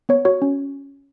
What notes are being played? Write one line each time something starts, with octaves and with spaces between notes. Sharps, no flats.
B3 C#5
F#4 C#5
C#4